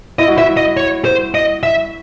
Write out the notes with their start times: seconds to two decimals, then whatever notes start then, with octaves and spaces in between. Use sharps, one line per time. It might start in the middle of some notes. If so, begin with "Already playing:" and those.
0.19 E4 D#5
0.28 F#4
0.36 E4 E5
0.57 D#5
0.77 C#5
1.05 C5
1.35 D#5
1.63 E5